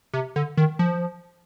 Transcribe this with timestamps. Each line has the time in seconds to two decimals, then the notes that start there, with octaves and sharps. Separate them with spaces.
0.13 C3
0.36 D3
0.57 D#3
0.79 F3